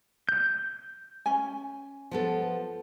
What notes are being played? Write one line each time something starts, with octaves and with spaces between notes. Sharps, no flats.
G6
C#4 G#5
F3 B3 A4